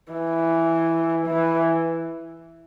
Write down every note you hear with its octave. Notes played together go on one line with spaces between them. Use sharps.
E3
E3